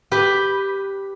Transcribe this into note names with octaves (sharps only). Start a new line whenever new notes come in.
G4 B4